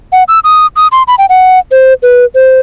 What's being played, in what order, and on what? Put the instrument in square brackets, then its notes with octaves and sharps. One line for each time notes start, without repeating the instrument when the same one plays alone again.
[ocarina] F#5
E6
D#6
D#6
C6
B5
G5
F#5
C5
B4
C5